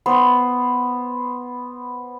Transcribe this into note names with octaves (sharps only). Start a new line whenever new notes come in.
B3 C5